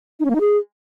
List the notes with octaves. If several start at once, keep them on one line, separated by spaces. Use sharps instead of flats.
D#4
C#4
A#3
D#4
G#4